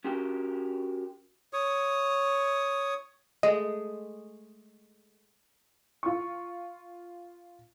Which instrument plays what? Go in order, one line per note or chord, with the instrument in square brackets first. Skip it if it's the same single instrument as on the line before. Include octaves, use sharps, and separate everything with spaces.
[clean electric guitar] C#4 F#4 G4 A#4 G5
[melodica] C#5 D#6
[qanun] G#3 A3 G#4 [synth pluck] D#5
[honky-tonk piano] F4 C#6